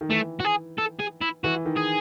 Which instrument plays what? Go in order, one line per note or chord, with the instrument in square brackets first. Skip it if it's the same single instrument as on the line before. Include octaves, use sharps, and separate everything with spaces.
[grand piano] D#3
[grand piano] E3 [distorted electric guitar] A3
[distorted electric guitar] F#4
G#4
A4
G#4
E4
[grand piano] E3 [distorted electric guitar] F#4
[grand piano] D#3
[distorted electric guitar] G#4